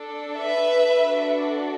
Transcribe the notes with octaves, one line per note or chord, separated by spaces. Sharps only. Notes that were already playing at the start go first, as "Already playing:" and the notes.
Already playing: D4 A4
B4 E5
D4 F#4 A4